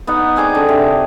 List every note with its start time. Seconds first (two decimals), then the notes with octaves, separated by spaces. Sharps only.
0.07 B3 D#4 F#5
0.36 C4 G#4 D5 D6
0.55 D3
0.69 C3